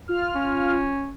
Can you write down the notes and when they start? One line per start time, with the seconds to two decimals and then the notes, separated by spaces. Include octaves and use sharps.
0.08 F4 F6
0.35 C#4